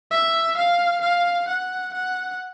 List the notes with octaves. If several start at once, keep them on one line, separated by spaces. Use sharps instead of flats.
E5
F5
F5
F#5
F#5